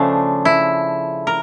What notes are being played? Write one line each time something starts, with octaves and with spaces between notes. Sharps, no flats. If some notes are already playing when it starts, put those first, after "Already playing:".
Already playing: C#3 F3 A3 D4
E4
A#4